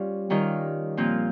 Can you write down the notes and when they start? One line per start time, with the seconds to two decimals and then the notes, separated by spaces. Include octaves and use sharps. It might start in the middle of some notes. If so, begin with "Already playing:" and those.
Already playing: G3 C#4 F4
0.30 D#3 G3 C#4 F4
0.97 A#2 F3 C4 F4